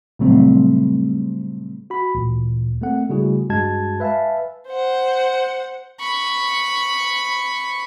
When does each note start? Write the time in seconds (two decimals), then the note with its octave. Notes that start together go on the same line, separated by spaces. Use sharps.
0.19 A#2 C#3 F#3 G3 A3 C4
1.90 F#4 B5
2.15 D2 A#2 E3
2.81 A3 A#3 C4 A4 F#5
3.09 C#3 G3 A3 E4 F#4 G#4
3.50 G2 G#3 F#4 A5 G#6
4.00 B4 E5 F5 G#5 A5
4.68 C5 F#5
6.00 B5 C#6